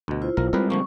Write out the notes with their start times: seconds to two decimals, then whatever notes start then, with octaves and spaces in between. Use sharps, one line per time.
0.08 D2 B2
0.22 E4 F4 C5
0.37 B1 A#4
0.53 G3 G#3 C4 A#4 B4
0.70 D3 F3 A#3 C#6